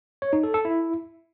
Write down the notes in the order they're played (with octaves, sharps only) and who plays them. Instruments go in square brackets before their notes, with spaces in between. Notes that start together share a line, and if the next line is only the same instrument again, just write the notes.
[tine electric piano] C#5
D#4
A4
A4
E4